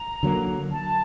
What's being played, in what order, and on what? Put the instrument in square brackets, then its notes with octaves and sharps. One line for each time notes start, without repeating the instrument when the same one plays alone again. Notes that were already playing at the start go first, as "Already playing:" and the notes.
Already playing: [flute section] A#5
[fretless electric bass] D3 F#3 A#3
[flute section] A5